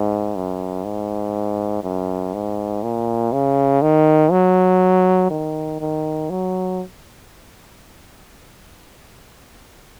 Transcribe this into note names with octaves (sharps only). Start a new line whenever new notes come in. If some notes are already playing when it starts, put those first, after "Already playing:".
Already playing: G#2
F#2
G#2
F#2
G#2
A#2
C#3
D#3
F#3
D#3
D#3
F#3